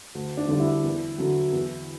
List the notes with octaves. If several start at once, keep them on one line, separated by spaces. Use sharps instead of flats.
D2
D4
D3 G3 D4
E4
E2
D3 F#3
E2